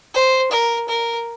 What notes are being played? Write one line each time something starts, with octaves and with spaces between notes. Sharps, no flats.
C5
A#4
A#4